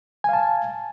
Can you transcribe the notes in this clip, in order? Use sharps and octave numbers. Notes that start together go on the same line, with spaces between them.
F5 G#5 A5